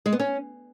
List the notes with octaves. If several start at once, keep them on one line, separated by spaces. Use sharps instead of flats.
G#3
B3
C#4